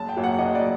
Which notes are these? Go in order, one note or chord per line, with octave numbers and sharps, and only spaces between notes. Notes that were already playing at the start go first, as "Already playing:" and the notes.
Already playing: F#1 A5
G5
F#2 F#3 A#3
F#5
F#1 D#5
D5